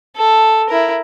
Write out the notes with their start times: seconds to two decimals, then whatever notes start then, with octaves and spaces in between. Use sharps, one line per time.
0.16 A4
0.69 E4 A#4